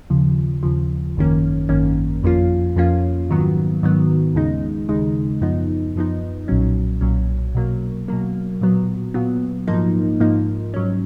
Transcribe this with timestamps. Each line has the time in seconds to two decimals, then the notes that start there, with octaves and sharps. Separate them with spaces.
0.10 D#2 C#3 F3
0.63 D#2 C#3 F3
1.16 G#1 F#2 D#3 A#3 C#4
1.69 G#1 F#2 D#3 A#3 C#4
2.23 F2 F3 A#3 C#4 F4
2.76 F2 F3 A#3 C#4 F4
3.30 G#2 D#3 F#3 B3
3.83 G#2 D#3 F#3 B3
4.35 D#2 C#3 G#3 D#4
4.89 D#2 C#3 G#3 D#4
5.41 F#2 F3 B3 D#4
5.96 F#2 F3 B3 D#4
6.48 B1 A#2 F#3 C#4
7.01 B1 A#2 F#3 C#4
7.55 B2 F#3 A#3
8.08 B2 F#3 A#3
8.61 A#2 F#3 B3
9.14 A#2 F#3 B3
9.68 G#2 F3 A#3 D#4
10.20 G#2 F3 A#3 D#4
10.74 G#2 F#3 C#4